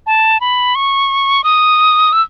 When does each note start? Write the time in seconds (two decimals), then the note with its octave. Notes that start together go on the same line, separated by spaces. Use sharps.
0.07 A5
0.40 B5
0.75 C#6
1.44 D#6
2.13 E6